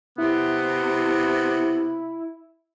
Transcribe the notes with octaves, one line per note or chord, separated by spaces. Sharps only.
C3 B3 E4